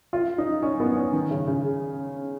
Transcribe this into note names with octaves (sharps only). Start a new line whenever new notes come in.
F4
D#4
C#4
B3
C#4
D#3
C#3
C#3